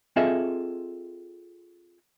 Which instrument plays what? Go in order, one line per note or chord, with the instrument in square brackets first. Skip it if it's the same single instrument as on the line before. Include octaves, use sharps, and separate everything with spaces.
[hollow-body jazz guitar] C4 F4 G#4 A4 D#5 E5